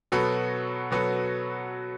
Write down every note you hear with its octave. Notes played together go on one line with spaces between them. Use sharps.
B2 F#3 B3 F#4 A4
B2 F#3 B3 F#4 A4